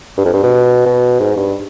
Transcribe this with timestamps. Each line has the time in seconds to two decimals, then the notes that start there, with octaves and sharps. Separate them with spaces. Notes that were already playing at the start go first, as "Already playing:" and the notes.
0.18 G2
0.25 F2
0.34 G2
0.43 B2
0.86 B2
1.20 G#2
1.36 G2